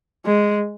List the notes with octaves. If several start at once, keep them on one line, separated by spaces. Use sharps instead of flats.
G#3